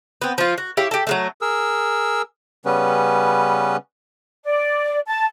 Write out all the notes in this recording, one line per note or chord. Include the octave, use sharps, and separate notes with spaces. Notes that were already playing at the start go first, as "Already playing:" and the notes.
B3 C4
F3 F4
F#4
E4 G4 C#5 F5
G4 A4
F#3 G#3 A3
G#4 A#4 E6
C#3 G3 B3 C#4 B4
D5
A5